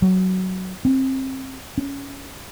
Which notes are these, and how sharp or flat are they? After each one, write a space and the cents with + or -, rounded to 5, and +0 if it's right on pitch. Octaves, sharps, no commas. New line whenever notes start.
F#3 +10
C4 +25
C#4 +10